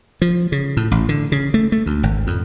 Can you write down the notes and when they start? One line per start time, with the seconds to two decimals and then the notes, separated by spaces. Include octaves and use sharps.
0.22 F3
0.52 C#3
0.77 A2
0.91 A1
1.09 D3
1.32 C#3
1.54 A3
1.72 A3
1.86 D2
2.03 G#1
2.27 F2